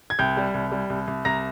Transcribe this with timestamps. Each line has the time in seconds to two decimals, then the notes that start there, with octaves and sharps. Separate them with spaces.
0.10 G#6
0.19 C2 G5 G6
0.37 G3
0.54 C2
0.72 G3
0.90 C2
1.07 C2
1.25 C2 A#5 A#6